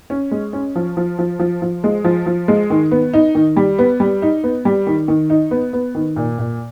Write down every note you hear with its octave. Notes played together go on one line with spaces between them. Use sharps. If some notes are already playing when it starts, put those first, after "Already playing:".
C#4
G#3
C#4
F3
F3
F3
F3
F3
G#3
F3
F3
G#3
D#3
B3
D#4
D#3
G3
B3
G3
D#4
B3
G3
D#3
D#3
D#4
B3
B3
D#3
A#2
A#2